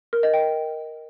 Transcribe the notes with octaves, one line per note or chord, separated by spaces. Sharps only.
A#4
D#5
G5